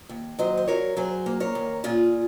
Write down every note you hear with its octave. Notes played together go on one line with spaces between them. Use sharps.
D#2
F#3 C5 D#5
C5
F#3 A#4 C#5
F#3 G#4 C5
A#3
A#4 C#5
D#2
A#2 F4 G#4